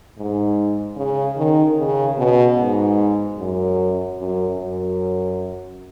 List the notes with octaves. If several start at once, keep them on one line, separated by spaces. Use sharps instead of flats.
G#2
C#3
D#3
C#3
B2
G#2
F#2
F#2
F#2